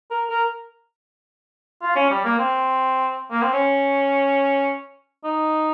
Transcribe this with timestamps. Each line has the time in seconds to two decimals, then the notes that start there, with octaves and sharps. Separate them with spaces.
0.11 A#4
0.30 A#4
1.82 F4
1.96 C#4
2.10 G3
2.25 A#3
2.39 C4
3.31 A#3
3.42 C4
3.53 C#4
5.24 D#4